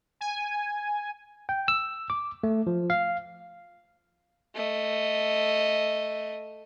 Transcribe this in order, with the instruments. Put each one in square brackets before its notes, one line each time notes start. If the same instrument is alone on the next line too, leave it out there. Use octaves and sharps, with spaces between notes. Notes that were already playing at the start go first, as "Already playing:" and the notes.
[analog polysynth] G#5
[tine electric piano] G5
E6
D6
A3
F3
F5
[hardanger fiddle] A3 D#5